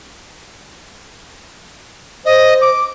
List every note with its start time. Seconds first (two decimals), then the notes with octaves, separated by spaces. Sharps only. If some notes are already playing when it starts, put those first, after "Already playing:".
2.25 C5 D#5
2.61 D6